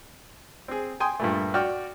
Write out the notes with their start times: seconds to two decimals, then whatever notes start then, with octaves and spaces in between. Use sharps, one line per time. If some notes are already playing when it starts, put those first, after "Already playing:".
0.68 C4 G#4
1.00 G5 G#5 C6 D#6
1.20 G2 A#2 A3
1.54 F#4 D5 G5 F6